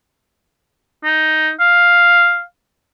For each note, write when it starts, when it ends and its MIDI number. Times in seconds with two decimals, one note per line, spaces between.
1.04 1.51 63
1.60 2.42 77